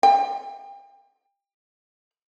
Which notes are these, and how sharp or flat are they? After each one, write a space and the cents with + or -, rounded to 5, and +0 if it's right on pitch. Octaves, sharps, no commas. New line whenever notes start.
G5 +30